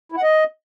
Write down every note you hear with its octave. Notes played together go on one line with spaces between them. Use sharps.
E4
F#5
D#5